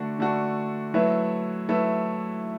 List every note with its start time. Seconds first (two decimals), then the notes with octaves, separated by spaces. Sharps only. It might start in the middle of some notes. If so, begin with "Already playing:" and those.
Already playing: D3 A3 D4 F#4
0.18 D3 A3 D4 F#4
0.94 F#3 A3 E4 B4 E5
1.69 F#3 A3 E4 B4 E5